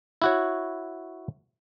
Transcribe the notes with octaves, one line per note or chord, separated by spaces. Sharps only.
E4 F#4 C#5